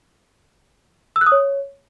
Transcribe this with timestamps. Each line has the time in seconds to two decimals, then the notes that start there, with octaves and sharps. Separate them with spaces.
1.16 E6
1.21 F#6
1.27 D#6
1.32 C#5